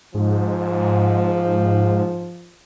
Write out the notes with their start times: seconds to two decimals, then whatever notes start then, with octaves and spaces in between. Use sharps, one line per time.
0.15 G#2 F3